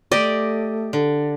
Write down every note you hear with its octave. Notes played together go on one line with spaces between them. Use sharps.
A3 G4 D5 D#5
D3